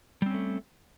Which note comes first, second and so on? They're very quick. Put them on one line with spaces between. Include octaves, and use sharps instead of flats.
G3 C4 C#4 A3